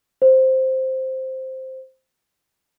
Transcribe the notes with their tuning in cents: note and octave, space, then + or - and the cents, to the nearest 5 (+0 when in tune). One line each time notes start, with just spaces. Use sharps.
C5 +0